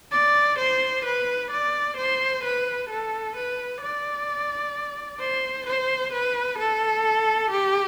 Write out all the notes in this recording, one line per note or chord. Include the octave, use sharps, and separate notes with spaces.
D5
C5
B4
D5
C5
B4
A4
B4
D5
C5
C5
B4
A4
G4